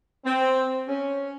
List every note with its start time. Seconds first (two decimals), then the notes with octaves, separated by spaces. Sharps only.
0.24 C4
0.88 C#4